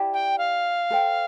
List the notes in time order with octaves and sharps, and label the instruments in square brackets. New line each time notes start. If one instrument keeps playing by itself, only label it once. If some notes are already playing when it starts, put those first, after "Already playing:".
Already playing: [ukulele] E4 G4 D5 A5
[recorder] G5
F5
[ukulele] A4 C5 G5